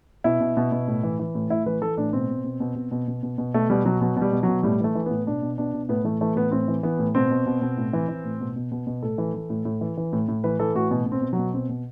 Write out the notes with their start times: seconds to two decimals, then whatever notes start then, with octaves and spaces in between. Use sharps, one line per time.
0.24 B2 E4
0.40 B2
0.57 B2
0.72 B2
0.88 A2
1.03 E3
1.19 E3
1.35 A2
1.50 A2 E4
1.66 E3 B4
1.82 E3 A4
1.97 A2 D4
2.13 B2 C4
2.29 B2
2.44 B2
2.60 B2
2.75 B2
2.91 B2
3.08 B2
3.23 B2
3.38 B2
3.54 B2 A3
3.70 B2 G3
3.85 B2 F#3
4.01 B2 F#3
4.16 B2
4.22 G3
4.32 B2
4.43 B2 F#3
4.63 A2 G3
4.80 E3 A3
4.95 E3
5.06 A2 B3
5.27 B2 D4
5.42 B2
5.58 B2 D4
5.73 B2
5.89 A2 B3
6.04 E3 A3
6.21 E3 A3
6.36 A2 B3
6.51 A2 C4
6.68 E3
6.83 E3 B3
6.99 A2
7.15 B2 C4
7.30 B2
7.46 B2
7.62 B2
7.77 A2
7.93 E3
8.09 E3
8.24 A2
8.40 B2
8.56 B2
8.71 B2
8.87 B2
9.02 A2 A4
9.18 E3
9.34 E3
9.50 A2
9.65 A2
9.81 E3
9.97 E3
10.13 A2
10.28 A2
10.44 E3 B4
10.59 E3 A4
10.75 A2 F#4
10.91 B2
11.06 B2
11.12 C4
11.22 B2
11.33 F#3
11.38 B2
11.54 B2 C4
11.69 B2